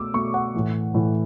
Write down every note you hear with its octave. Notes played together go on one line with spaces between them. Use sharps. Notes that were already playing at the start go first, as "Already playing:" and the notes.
Already playing: B2 A3 D6 E6
B2 A3 C#6
F#5
A2 E3 A3
A2 E3 A3